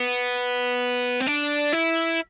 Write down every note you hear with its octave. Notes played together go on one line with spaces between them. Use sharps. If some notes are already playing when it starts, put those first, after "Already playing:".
Already playing: B3
C4
D4
E4